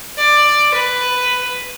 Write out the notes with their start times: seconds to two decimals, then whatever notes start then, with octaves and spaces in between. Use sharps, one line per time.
0.17 D5
0.73 B4